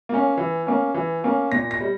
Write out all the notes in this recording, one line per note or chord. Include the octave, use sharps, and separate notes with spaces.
A#3 C#4
E3
A#3 C#4
E3
A#3 C#4
A#2 A#6
A#6
G3